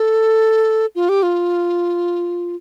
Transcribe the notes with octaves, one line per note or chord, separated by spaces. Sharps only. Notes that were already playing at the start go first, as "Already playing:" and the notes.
Already playing: A4
F4
G4
F4